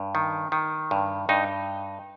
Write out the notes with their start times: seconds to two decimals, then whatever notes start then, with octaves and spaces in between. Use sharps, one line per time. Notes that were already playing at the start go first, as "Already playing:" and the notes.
Already playing: G2
0.15 D#3
0.52 D#3
0.91 G2
1.29 G2 D#4